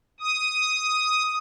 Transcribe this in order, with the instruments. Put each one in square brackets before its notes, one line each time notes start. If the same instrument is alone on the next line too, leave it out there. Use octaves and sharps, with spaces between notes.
[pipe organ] D#6